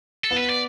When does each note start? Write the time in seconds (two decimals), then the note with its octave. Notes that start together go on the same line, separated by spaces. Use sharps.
0.24 A4
0.31 B3
0.36 B4
0.50 D5